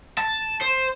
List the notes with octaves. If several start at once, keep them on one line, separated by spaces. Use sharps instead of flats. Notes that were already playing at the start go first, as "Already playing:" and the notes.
A5
C5